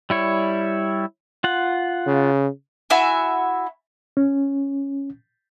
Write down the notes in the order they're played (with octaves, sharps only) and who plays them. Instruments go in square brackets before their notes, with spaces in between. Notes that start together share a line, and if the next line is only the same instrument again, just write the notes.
[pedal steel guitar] G3 E4 C#5
F4 F#5
[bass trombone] C#3
[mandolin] E4 F#4 E5 G#5
[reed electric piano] C#4